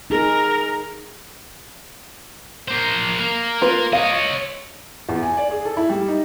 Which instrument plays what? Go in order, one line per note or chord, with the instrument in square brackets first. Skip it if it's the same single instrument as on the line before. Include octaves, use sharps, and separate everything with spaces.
[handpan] D#4 G#4 [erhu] A#4
[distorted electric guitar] A#3 C5
A#3
[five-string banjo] F4 B4
[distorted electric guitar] C#5 D#5 [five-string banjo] F5
[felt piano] E2
G#5
D5
G#4
A4
E4
G3
D#4